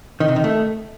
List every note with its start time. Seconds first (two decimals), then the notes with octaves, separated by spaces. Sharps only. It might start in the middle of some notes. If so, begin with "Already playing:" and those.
0.20 D#3
0.28 C3
0.36 D#3
0.44 A3